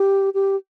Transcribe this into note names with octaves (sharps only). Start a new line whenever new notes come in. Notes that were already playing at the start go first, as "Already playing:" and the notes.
Already playing: G4
G4